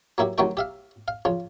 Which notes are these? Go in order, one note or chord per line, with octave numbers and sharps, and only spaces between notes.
F#3 A#3 E4 G4
C2 D#3 F#3 A3 F#4 G5
G4 E5 F5
F5
C#3 F3